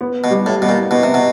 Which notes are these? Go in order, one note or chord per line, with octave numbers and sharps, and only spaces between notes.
B3
B2
G3
A2
B2 G3
A#2
B2 B3
C3
B2